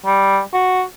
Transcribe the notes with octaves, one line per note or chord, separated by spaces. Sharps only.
G3
F#4